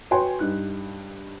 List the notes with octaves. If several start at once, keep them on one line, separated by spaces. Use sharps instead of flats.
F#4 B4 C#5 G5 G#5 C6
G2 D#4 F#6